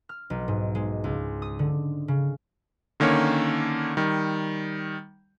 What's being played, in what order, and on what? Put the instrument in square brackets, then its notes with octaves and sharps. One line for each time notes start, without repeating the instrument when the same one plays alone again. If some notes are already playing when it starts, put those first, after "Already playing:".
[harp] F6
B1
G#2
G#3
C#2
D#6
D3
C#3
[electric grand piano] D3 D#3 A#3 C#4 C#5
D#3 G3